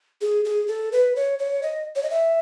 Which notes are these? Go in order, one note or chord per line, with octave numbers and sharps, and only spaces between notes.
G#4
G#4
A4
B4
C#5
C#5
D#5
C#5
D#5
E5